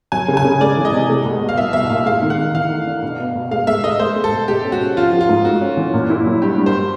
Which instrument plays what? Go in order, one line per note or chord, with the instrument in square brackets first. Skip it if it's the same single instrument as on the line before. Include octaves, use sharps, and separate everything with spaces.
[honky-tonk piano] F#3 [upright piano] G#5
[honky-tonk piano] C#3
[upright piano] G#5
[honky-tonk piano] C#3
[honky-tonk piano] G#3 [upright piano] D5
[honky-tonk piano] E3
[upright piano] D#5
[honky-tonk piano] C3
G#3
B2
B2
[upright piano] F5
[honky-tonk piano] C2 [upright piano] E5
[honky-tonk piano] C2 [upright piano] E5
[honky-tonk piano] A#2 [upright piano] F5
[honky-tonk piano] G#3 [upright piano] F5
[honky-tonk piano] D#3
[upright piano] F#5
[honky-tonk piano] D#3
[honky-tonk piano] E3 [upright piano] F5
[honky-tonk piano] A3
D4
B2
B3
B2
[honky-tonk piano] G#3 [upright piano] F5
[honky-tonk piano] G#3 [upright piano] E5
[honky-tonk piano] G#3 [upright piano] D#5
[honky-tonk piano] G#3 [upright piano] C5
[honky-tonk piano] G#3
[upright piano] A4
[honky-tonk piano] B2
[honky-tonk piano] G#3 [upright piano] G4
[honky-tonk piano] C#4
[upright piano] F#4
[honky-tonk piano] C#4
[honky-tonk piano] F3 [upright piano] F4
[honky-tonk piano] F3
[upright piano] F4
[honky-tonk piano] G#2
[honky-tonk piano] A3 [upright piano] F#4
[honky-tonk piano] C#4
E3
A#2
E4
F#3
[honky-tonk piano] G2 [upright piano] G4
[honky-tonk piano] G3
[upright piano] C5